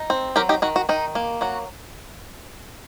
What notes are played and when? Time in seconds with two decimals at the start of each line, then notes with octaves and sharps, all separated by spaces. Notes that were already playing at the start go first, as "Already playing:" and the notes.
Already playing: D#4
0.10 C4
0.36 F#3 G4 A#4
0.49 D#4 G4
0.62 D#3 F#4
0.76 F#4
0.89 D#3 D#4
1.15 A#3
1.41 F#3 F#4